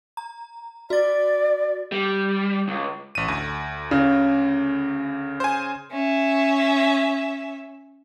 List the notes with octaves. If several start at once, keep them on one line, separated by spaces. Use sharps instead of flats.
A#5
F#4 D5 A6
G3
C#2
A1 D#7
D2
C#3
C5 G#5
C#4 E5